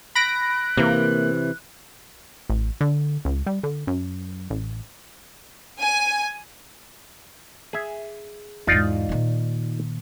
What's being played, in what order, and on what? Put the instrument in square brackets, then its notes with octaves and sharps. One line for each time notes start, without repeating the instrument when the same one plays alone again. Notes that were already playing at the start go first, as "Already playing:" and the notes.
[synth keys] B5 A#6 D7 [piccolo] F#6
[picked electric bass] C3 E3 [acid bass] A#3
[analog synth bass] A1
D3
C#2
G3
D3
F#2
A1
[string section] G#5
[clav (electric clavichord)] G#4 E5
[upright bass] E2 G#2 [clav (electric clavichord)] D#4 F4 D5
[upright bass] A#2 D#3